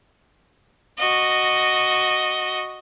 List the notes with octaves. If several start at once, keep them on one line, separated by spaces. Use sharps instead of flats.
F#4 D#5